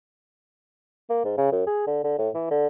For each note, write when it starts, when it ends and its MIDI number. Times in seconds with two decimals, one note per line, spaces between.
1.10 1.22 58
1.24 1.36 44
1.37 1.52 49
1.52 1.64 42
1.67 1.84 68
1.87 2.00 50
2.04 2.17 50
2.18 2.29 45
2.34 2.48 52
2.51 2.67 50